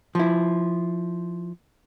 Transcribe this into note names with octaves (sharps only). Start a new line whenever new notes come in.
F3 E4